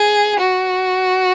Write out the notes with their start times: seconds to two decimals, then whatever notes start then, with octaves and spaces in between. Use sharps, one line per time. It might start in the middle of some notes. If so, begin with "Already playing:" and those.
Already playing: G#4
0.39 F#4